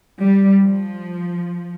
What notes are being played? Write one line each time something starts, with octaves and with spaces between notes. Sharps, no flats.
G3
F3